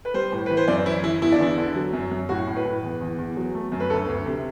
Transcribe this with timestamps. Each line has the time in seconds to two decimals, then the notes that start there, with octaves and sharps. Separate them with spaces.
0.05 B4
0.14 G3 C5
0.32 A2
0.46 E3 B4
0.57 C5
0.68 F#2 D5
0.86 E3 E4
1.04 E3 E4
1.22 E2 E4
1.32 D4
1.40 E2 E4
1.57 D3
1.75 F#3
1.93 F#2
2.11 F#2
2.29 A2 F#4
2.47 A2
2.56 B4
2.65 A2
2.83 E2
3.01 E2
3.18 E2
3.37 F#3
3.54 A3
3.72 F#2
3.80 B4
3.90 D2 A4
4.08 D2
4.26 C3